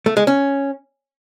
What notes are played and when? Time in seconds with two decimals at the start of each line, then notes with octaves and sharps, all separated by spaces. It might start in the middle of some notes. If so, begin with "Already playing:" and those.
0.06 A3
0.17 G#3
0.27 C#4